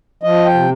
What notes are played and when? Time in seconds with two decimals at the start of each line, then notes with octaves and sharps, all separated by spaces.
0.23 F3 D#5
0.46 G5
0.54 C3